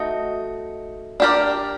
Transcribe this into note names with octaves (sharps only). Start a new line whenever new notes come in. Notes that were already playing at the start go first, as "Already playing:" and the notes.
Already playing: A3 D#4 F#4
D4 G4 A#4 D5